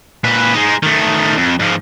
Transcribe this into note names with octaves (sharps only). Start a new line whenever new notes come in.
A#2 B4
G#3 D#4
D#3 A3
F2
G#2 F3